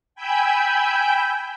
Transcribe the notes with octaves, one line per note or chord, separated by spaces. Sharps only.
G5 G#5 B5 E6 G6